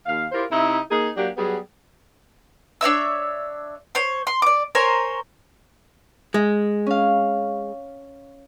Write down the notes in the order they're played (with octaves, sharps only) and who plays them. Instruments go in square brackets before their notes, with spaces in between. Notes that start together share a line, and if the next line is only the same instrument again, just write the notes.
[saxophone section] D#2 F5
E4 F4 G4 A#4 C5
C3 D#4 E4
A#3 D#4 G#4
F#3 A#3 D4 G4
F#3 G3 B3 G#4
[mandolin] D4 C#5 E5 E6
C5 C#5
C6
D5 D6
A#4 C5 C#5 G#5
[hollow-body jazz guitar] G#3
[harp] C#4 F5